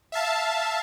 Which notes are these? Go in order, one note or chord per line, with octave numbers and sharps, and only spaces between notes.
E5 F5 A5